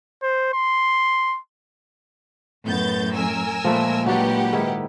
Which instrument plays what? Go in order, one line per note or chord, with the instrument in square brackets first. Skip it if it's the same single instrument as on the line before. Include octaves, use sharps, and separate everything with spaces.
[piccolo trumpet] C5
C6
[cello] F#2 A2 [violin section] B3 G6 A6
[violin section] A#4 G#5 E6
[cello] A#2 G#3 [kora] F3 A3 B4
[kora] F#3 D4 [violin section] G4 B4 F#5
[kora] G#2 D#3 E4